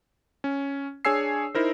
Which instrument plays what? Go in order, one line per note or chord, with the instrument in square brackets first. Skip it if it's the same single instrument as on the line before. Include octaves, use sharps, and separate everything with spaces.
[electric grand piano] C#4
D4 G#4 C#5 G#5 E6 C7
D#4 E4 A#4 C5